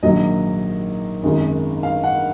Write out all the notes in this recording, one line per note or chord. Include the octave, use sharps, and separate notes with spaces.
A#1 G#2 D#3 F#3 D#5
G#1 F#2 D#3 G#3
F5
F#5